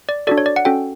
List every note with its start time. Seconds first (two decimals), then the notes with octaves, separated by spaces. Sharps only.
0.09 D5
0.27 D4 F#4 A4 D5
0.38 C#5
0.46 D5
0.56 F#5
0.65 C#4 F#4 A4 G5